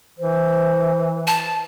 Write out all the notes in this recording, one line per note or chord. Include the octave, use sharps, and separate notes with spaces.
E3 C5
A5